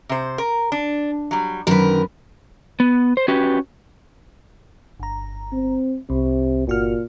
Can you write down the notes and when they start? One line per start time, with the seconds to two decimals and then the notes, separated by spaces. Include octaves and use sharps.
0.09 C3 C5
0.38 A#4
0.72 D4
1.31 F#3 G3
1.67 F#2 D3 D#3 A#4 B4
2.80 B3
3.17 C5
3.28 C#4 F#4 G4 B4
5.00 G1 A#5
5.52 C4
6.10 C2 C3
6.67 G1 A#2 F#4 F6